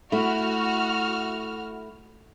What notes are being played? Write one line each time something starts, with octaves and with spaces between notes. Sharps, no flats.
A3 E4 F#4 F6